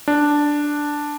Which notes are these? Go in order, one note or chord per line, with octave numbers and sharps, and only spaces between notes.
D4